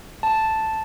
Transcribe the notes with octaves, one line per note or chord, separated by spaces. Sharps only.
A5